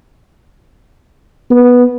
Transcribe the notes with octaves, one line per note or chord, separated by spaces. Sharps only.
B3